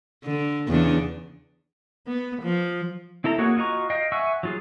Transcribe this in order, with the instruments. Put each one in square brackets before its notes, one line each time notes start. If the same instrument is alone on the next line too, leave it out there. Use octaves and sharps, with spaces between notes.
[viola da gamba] D3
E2 C#3 D4
B3
F3
[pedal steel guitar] C4 E4 A4 A#5
A#3 F#4 G#4 C#5 F#5
F4 F#4 D#5 A#5 C#6
D#5 F5 G5
E5 F#5 G#5 C#6 E6
F#3 F4 G#4